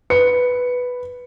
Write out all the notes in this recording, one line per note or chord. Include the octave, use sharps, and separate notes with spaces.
B4 C#7